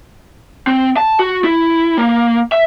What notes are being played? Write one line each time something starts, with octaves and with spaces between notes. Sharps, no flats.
C4
A5
F#4
E4
A#3
E5